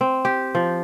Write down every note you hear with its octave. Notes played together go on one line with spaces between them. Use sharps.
C4
G4
F3